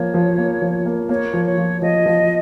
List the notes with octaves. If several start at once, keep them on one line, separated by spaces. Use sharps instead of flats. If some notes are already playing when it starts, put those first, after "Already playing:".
Already playing: F3 A#3 C#5
F3
A#3
F3
A#3
A#3 C#5
F3
C#5
F3
F3 D#5
F3